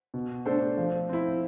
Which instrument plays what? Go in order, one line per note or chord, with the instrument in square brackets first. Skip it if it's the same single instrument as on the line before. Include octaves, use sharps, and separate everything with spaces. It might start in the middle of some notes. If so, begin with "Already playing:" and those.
[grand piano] B2
A3 D4 A4 C5
F3
C4 E4